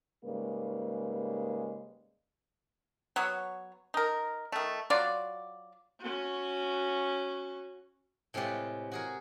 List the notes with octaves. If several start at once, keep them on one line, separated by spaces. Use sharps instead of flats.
G#2 C#3 G3 G#3 A#3 B4
F#3 B3 C#5
D#4 A#4
D#3 A3
F#3 F4 F#4 D5
C#4 F#4
A2 C3 G#3 F4 G4 B4
F#4 G#4 A#4